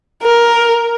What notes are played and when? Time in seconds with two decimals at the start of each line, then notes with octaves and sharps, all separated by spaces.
0.23 A#4